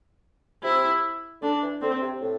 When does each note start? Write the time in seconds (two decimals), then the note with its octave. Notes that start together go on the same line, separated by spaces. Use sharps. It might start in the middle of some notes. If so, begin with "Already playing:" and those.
0.63 C3 E4
1.42 D3 D4
1.62 E3
1.82 D3 C4
2.02 C3
2.21 A2